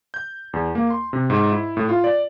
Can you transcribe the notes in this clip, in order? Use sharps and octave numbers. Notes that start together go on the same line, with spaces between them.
G6
E2
A#3
C6
C3
G#2
E4
A2
F4
D5